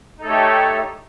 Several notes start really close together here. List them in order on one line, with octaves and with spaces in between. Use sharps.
D#4 A4 A3 C#5 G4